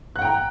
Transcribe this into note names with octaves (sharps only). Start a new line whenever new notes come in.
F#5 G5 A#5 F#6